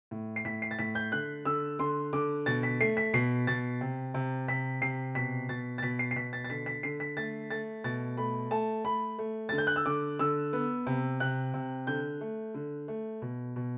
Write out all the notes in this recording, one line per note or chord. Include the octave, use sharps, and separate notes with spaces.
A2
C7
A2 B6
C7
A6
A2 B6
G6
D3 F#6
D3 E6
D3 C6
D3 D6
B2 A6
B6
A3 C7
B6
B2 C7
B2 A6
C3
C3
C3 B6
C3 C7
B2 B6
B2 A6
A6
B2 B6
C7
C7
B2 B6
A6
A6
D3 B6
B6
D3 C7
B6
A3 A6
A3 A6
B2 A6
A3 B5
A3 A5
A3 B5
A3
D3 A6
G6
F#6
E6
D3 D6
D3 E6
B3
C3
C3 F#6
C3
D3 G6
A3
D3
A3
B2
B2